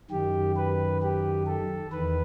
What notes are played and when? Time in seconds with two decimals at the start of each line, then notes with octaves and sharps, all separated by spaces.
0.10 F#2 D#3 G4
0.57 B4
1.02 G4
1.46 A4
1.92 E2 D#3 B4